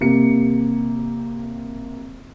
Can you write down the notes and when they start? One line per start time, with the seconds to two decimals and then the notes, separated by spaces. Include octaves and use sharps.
0.01 C3 A#3 C#7